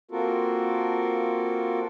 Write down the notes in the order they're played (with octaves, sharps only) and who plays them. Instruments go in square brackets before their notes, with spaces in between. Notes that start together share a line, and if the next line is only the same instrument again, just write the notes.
[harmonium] A#3 C4 F4 F#4 A4 A#4